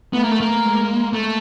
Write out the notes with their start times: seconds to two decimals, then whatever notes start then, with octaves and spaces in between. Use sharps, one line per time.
0.13 A3 B3
0.22 A#3
0.32 A3
0.40 A#3
0.63 G#3
1.13 A3